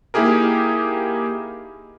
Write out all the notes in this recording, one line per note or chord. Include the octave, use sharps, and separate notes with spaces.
A#3 D#4 E4 G4 G#4 A#4